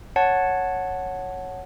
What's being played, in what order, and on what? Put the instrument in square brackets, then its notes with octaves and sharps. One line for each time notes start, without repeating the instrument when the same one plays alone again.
[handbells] C#5 F#5 A5